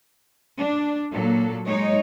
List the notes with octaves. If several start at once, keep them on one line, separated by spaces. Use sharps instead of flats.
D4
A#2 F#3 A#3 A4
G#3 D#4 C#5